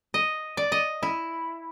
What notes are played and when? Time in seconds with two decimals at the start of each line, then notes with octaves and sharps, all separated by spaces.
0.14 D#5
0.57 D5
0.72 D#5
1.03 E4